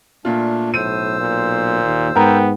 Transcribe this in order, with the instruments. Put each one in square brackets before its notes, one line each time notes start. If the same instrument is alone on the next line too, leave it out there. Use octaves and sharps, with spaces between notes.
[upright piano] A#2 F4 [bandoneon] A3 D4
[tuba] B1 [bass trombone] A2 [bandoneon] C5 E6 [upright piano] D#7
[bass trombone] A#2
[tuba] D#2
[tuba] G#2 [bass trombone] B3 [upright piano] A#4 G5 A#5